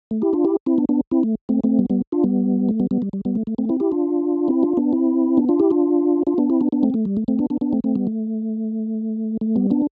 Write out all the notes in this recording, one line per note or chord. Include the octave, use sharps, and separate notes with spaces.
A3
E4 G4
D4 F4
E4 G4
C4 E4
B3 D4
B3 D4
C4 E4
A3
A3 C4
A3 C4
G3 B3
G3 B3
D4 F4
G3 B3
A3
G3 B3
G3 B3
G3
G3
G3 B3
A3
A3
A3 C4
C4 E4
E4 G4
D4 F4
C4 E4
D4 F4
B3 D4
C4 E4
B3 D4
D4 F4
E4 G4
D4 F4
D4 F4
B3 D4
C4 E4
B3 D4
B3 D4
A3 C4
A3
G3
A3
A3 C4
B3 D4
B3 D4
B3 D4
A3 C4
A3 C4
G3 B3
A3
A3
G3 B3
B3 D4